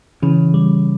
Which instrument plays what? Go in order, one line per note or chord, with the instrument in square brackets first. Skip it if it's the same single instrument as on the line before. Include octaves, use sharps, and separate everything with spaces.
[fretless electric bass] C#3 [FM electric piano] E3
[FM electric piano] G3